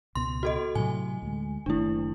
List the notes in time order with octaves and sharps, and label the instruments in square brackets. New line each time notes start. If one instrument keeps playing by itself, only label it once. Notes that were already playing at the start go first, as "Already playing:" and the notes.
[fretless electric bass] C#2 B2 [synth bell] C6
[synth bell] F#4 A4 D#5
[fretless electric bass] A2 C3 F#3 [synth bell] G#5
[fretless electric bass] D2 G#3
[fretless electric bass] F#1 D#3 A3 [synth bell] D4 E4